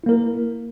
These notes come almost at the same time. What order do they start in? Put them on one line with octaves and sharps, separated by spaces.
E4 A#3 A#4